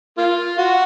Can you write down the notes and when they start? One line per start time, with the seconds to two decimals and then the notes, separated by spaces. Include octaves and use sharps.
0.18 A#3 F4
0.58 F#4